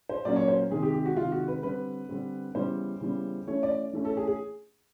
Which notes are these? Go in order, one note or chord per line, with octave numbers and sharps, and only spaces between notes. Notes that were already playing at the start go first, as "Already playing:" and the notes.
C5
A#2 F#3 A#3 C#4 D5
C#5
C5
C3 D#3 G#3 G#4
G4
G4
F#4
C3 D#3 G#3 F4
F#4
B4
D3 G3 C4 B4
D3 G3 C4
C#3 E3 G3 B3 C5
C#3 E3 G3 B3
E3 A3 C#4 C#5
D5
E3 A3 C#4
A4
G#4
G#4